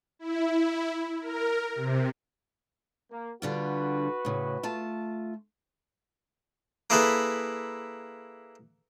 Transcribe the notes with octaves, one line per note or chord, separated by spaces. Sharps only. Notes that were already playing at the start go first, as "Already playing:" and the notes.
E4
A#4
C3
A#3
D3 G3 F4 F#4 B4
A2 C#3
A3 F4 A5
A#3 E4 G#4 A4 B4